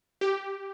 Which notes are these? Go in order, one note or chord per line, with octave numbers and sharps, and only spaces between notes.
G4